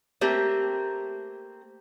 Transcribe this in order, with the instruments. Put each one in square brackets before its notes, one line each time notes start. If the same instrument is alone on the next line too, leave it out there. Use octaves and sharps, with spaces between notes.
[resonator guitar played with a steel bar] A3 A#3 C4 G4